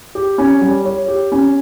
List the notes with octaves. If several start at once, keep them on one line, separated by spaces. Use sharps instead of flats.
G4
C#4
G3
C#5
G4
C#4